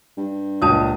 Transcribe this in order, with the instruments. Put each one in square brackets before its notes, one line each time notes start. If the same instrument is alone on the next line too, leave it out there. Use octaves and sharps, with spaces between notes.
[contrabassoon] G2
[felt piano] C#2 A#2 [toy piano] D4 A5 D#6